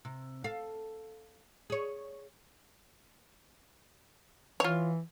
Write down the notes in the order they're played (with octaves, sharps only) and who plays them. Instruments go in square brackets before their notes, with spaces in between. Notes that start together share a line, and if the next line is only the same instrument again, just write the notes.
[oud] C3
A4 F5
G#4 C#5
[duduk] E3 [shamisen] F4 C#5